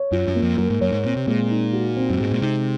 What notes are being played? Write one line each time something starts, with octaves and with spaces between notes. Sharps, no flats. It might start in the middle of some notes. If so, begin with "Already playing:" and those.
Already playing: C#5
F#2 F4
F#2
A#3
F2
F#2 A#4
G#2
F#2 C#5
G#2
A#2 C4
C3
A#2 G#3
D#4
F#4
C4
F#2
G#2 G#3
A#2
C3 D#4